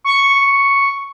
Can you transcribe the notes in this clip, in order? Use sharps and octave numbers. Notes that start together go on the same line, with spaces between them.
C#6